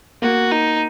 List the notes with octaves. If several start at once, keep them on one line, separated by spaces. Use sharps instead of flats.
A#3 F#4
D#4